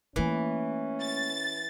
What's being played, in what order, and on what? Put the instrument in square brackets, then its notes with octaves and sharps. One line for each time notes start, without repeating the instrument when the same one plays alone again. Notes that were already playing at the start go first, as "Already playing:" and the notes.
[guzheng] E3 [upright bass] A3 A#3 [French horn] C#4
[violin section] A6